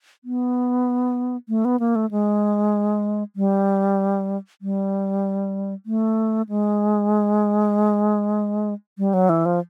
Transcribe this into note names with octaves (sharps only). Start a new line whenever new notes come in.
B3
A3
B3
A#3
A3
G#3
G3
G3
A3
G#3
G3
F#3
E3
F3